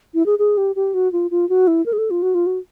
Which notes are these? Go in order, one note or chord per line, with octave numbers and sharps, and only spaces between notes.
E4
G#4
G#4
G4
G4
F#4
F4
F4
F#4
E4
A#4
G#4
A4
F4
F#4
F4
F#4